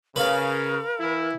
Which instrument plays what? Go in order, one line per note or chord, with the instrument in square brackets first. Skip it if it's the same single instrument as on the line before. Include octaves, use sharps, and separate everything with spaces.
[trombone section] C#3 [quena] A#4 [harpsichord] B4 F5
[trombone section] E3 E4